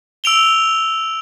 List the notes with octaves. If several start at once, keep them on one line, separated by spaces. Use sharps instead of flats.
E6 D7 F7 G7